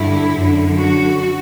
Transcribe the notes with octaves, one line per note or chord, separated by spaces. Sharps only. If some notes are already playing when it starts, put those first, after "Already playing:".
Already playing: G2 D3 E4
F#2 D3
F#4